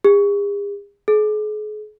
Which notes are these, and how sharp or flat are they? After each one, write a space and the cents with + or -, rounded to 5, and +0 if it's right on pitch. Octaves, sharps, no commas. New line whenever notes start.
G#4 -45
G#4 +40